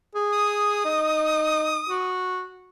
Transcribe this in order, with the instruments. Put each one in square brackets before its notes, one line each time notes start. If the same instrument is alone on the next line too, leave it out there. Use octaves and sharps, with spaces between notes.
[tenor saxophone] G#4
[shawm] D#6
[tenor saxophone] D#4
F#4